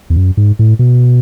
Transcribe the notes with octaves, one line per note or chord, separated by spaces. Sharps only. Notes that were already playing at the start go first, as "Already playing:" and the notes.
E2
F#2
G#2
A2
B2